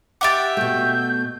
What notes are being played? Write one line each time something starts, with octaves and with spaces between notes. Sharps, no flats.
G4 E5 F#5 D6 A6
B2 A3 G6